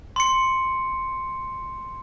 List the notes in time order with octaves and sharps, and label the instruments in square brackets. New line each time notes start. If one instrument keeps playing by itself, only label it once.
[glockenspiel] C6 C#7